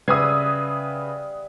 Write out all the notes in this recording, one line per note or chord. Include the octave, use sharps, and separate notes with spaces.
C#3 G3 B4 E5 F#5 D#6 G#6 C7